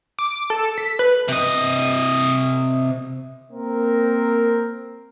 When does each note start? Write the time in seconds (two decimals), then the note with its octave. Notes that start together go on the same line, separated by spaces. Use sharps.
0.19 D6
0.50 A4
0.78 B6
0.99 B4
1.28 C3 D#5
3.52 A#3 C4 A#4